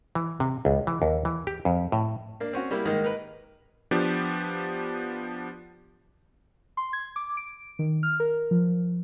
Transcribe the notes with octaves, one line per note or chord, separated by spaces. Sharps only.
E3
C3
C#2
E3
D#2
E3
G4
F2
A2
A#3 D4
C4 C#4 F#4
G3 A#3 E4
G#2 D#3 G#3 A#3
D#4 A#4 B4
F3 B3 D4 G4
C6
G#6
D6
D7
D#3
F6
A#4
F3